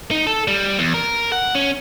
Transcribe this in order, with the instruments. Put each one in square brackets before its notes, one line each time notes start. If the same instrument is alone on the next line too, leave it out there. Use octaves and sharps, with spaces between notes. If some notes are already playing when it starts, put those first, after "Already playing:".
[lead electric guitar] D#4
A4
G3
E2
A#4
F#5
C#4